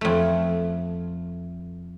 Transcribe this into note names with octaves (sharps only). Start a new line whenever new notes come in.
F2 A3